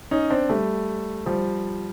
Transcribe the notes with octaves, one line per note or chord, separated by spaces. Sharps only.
C#4 D#4
C4 D4
G3 A3
F3 G3